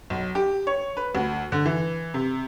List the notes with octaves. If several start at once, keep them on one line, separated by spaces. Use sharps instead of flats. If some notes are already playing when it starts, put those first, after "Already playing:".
B1
G4
C#5
B4
D2
D3
E3
C3